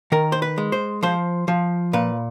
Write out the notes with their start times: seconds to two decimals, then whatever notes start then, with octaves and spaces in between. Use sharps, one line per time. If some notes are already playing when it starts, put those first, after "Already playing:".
0.12 D#3 A#4
0.32 C5
0.42 B4
0.58 G#3
0.72 C5
1.03 F3 C5
1.48 F3
1.93 A#2 B4